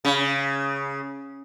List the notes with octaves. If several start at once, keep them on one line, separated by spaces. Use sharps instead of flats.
C#3